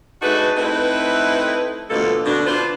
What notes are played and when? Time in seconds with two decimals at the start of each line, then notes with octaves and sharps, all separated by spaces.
0.22 A3 D4 D#4 F#4 G#4 B4
0.57 A3 C4 D#4 E4 B4
1.90 D2 G2 B2 F3 A#3 A4
2.26 B2 D3 D4
2.46 D4 F4 B4 C5